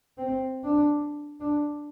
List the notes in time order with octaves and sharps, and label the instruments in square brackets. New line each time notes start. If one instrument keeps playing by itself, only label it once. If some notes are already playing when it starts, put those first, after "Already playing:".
[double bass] C4
D4
D4